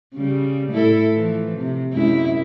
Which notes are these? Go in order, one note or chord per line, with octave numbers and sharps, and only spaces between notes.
C#3 G3
A2 E4 A4
E3 F3
C3
F#2 G#3 E4